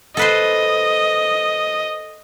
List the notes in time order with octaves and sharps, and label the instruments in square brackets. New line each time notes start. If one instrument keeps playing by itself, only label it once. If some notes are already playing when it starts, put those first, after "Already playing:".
[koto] A4 B4 C5 [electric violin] D#5